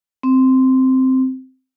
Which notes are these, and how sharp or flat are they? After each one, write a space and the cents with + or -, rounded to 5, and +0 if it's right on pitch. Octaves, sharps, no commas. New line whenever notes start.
C4 -5